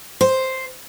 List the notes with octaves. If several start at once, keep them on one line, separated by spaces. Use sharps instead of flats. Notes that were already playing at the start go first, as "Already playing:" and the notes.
C5